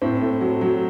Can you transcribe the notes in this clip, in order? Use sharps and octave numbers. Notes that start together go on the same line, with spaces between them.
A2 C4
A3
F#3
F#3